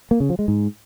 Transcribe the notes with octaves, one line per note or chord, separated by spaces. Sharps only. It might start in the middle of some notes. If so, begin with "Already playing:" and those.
A#3
C#3
F3
G#3
G#2